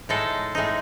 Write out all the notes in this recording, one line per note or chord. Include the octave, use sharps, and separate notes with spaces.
A2 G#3 D#4 A4
A2 G#3 D#4